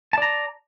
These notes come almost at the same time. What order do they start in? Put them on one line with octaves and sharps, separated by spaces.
A5 D5 A#5